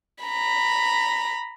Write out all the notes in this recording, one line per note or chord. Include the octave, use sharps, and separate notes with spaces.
A#5 B5